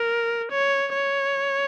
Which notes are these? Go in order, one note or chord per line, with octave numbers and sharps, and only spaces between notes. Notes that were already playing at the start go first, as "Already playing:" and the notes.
Already playing: A#4
C#5
C#5